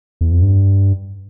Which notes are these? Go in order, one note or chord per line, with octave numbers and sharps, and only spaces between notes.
E2
F2
G2